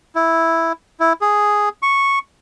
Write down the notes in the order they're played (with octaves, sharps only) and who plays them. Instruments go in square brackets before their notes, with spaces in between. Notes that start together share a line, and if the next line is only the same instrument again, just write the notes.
[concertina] E4
E4
G#4
C#6